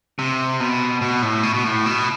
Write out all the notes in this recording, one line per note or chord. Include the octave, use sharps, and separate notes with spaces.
C3
B2
B2
A2
B2
B2
A2
B2